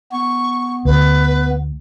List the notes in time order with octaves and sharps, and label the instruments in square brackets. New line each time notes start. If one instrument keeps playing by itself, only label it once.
[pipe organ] B3 [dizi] C#6
[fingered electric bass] D2 [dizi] B4